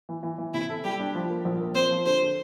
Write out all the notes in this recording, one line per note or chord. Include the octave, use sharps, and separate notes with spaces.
E3
E3
E3
C3 E4
A4
G3 G4
D4
F3
A#3
A#1
A#3
C4 C5
F3
D3 C5
D3